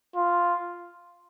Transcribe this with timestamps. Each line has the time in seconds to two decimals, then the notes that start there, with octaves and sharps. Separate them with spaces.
0.15 F4